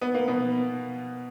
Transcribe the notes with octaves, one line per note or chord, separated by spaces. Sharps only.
B3
A#3
B2 B3